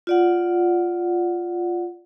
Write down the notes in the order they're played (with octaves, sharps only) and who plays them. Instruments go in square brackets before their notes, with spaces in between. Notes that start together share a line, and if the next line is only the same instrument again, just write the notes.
[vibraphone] F4 D5 F#5